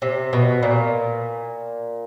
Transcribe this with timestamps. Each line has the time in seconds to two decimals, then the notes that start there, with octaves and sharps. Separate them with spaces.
0.02 C3
0.33 B2
0.63 A#2